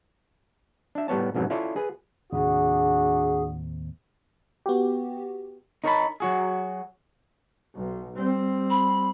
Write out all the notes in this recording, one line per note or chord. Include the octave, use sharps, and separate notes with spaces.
D4 E5
A2 G3 B3 C#5 A5
B1 F2 G#2 B2 F#3
C#4 E4 F4 A4 C#5 D5
G#4 B4
D#2 A2 C3 D4 F#4 G#4
B3 F#4 G4
D#4 A#4 C#5 D#5 A5 B5
F#3 F#4 G#4
B1
G3 C4
B5